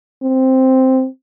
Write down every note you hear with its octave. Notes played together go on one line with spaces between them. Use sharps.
C4